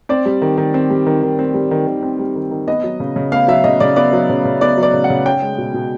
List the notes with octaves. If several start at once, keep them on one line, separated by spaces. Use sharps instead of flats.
C4 D5
G3
D#3
D#3
C4
G3
D#3
D#3
C4
G3
D#3
D#3
C4
G3
D#3
D#3
B3 D#5
F#3
C#3
C#3
B3 F5
F#3 E5
C#3 D#5
C#3 D5
B3 D5
F#3
C#3
C#3
B3 D5
F#3
D5
C#3
F#5
C#3
C#4 G5
G#3
B2
B2